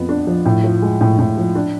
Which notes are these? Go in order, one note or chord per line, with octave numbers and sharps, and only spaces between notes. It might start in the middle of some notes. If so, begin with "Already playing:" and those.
Already playing: F2 F3 B3
D4
F3
A2
F3
G#3
A2
A2
F3
D4